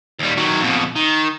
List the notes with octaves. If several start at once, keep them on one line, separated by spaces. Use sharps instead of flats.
D#2 G3
D#3 F#3
F2 B2
D#3